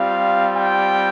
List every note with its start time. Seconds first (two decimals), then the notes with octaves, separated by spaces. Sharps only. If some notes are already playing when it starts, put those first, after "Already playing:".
Already playing: G3 C4 F4 F5
0.56 G5